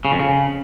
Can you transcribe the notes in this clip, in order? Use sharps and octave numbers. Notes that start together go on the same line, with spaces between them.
C#3
F2
C#3